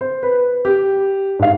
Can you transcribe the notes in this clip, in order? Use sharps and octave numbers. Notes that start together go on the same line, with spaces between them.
C5
B4
G4
G#2 F5